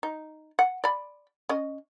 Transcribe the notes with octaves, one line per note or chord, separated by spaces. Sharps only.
D#4
F#5
D5 B5
C#4 D#5